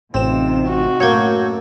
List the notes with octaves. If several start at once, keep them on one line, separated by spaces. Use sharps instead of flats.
A1 C3 C4 D#4 F4 E7
F#4
F#2 A2 A#3 A4 C#5 G6 G#6